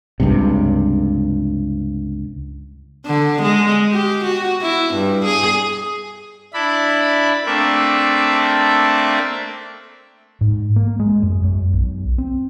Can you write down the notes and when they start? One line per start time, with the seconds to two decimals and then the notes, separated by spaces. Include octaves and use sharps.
0.20 C#2 G2 C3
3.07 D3
3.42 G#3
3.92 G4
4.24 F#4
4.62 E4
4.94 G2
5.25 G#4
6.54 D4 E4 B5
7.46 A3 A#3 C4 D4 E5
10.41 G#2
10.76 A#3
11.00 G#3
11.23 F#2
11.44 F#2
11.73 B1
12.18 C4